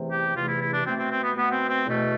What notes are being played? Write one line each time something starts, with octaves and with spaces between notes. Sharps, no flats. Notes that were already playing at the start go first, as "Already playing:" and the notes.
Already playing: E2 C3 E3 A3
G4
E2 C3 E3 A3 F4
E4
E4
D4
B2 A3 C4
C4
C4
B3
B2 A3 B3
C4
C4
E2 B2 A3